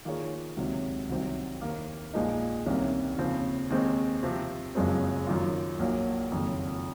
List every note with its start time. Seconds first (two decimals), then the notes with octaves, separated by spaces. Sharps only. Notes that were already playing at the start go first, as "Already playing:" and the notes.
0.05 D#3 A#3 F4 G#4 C#5
0.57 C#2 C3 D#3 F#3
1.09 C2 C3 D#3 F#3 C4
1.61 D#2 D#3 A#3
2.13 A#1 A#2 F3 G#3 D#4
2.66 C2 C3 D#3 A#3 C#4
3.18 D#2 C#3 F3 C4
3.70 D#2 D#3 G#3 C4 D#4
4.22 C3 F3 C4
4.75 F#1 F#2 F3 G#3 C4
5.27 F#2 D#3 A#3 F4
5.79 A#1 A#2 F#3 A#3
6.31 F#1 F2 D#3 F#3